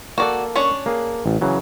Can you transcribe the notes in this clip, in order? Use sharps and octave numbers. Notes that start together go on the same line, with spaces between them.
A#3 F#4 A4 D5
C#4 D4 C#5
A#3 G#4
A1
C#3 E3 F#3